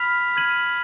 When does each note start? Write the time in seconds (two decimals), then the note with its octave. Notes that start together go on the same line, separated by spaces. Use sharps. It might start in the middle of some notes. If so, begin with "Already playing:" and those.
Already playing: B5 F6 B6 F7
0.36 F6 G#6 D#7 F#7